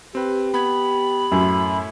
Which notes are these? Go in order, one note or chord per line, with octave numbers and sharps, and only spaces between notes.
C4 G4 B4
B3 B5 G#6
F#2 A2 E4